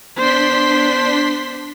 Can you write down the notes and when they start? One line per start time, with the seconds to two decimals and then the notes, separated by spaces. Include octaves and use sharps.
0.17 B3 D4 C5 C6 B6